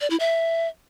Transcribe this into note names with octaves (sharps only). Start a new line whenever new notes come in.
D5
E4
E5